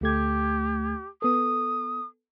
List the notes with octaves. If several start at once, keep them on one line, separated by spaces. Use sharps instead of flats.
D2 A3 G4 G#6
B3 A4 D#6